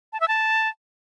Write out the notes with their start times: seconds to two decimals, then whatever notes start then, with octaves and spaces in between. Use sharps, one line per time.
0.13 A5
0.20 E5
0.28 A5